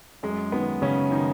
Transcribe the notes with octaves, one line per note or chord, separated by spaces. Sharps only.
F#2 G#3
D#3 B3
F#2 C#3 C#4
D#3 D#4